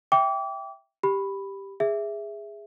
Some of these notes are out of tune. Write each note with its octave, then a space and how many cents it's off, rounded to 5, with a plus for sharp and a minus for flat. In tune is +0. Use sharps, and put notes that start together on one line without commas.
E5 +0 G5 +0 D6 -30
G4 +0 B5 +0
G#4 -10 E5 +0